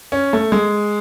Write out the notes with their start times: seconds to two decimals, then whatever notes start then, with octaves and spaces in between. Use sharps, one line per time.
0.12 C#4
0.33 A3
0.52 G#3